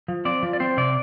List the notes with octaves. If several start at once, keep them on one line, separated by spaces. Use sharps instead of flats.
F3
C4 D5
F3
D5
C4 C5
C3 D5